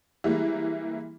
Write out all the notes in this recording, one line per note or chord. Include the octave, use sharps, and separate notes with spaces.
E3 G3 G#3 A#3